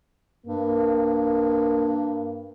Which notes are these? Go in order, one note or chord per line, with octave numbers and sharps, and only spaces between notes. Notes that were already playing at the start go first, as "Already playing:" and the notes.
G2 A#3